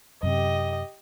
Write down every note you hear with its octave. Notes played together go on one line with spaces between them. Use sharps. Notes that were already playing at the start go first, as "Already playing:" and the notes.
F#2 C3 G4 D#5